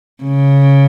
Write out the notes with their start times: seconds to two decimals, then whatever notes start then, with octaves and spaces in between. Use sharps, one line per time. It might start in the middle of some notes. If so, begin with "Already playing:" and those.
0.23 C#3